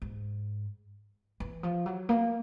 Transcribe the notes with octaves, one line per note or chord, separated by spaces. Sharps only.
G#2
E3
F3
F#3
A#3